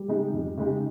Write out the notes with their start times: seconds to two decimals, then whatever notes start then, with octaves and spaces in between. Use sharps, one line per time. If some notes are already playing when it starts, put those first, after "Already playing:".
Already playing: G3
0.08 C#3 G#3 D#4 G4
0.33 F2
0.57 C#3 G#3 D#4 G4